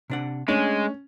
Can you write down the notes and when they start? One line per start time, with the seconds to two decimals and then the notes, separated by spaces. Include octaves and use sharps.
0.10 C3 D4 F#5
0.48 G#3 A3 C#4 D4